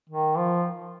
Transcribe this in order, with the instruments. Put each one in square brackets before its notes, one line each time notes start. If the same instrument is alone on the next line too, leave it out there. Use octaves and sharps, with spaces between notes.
[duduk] D#3
F3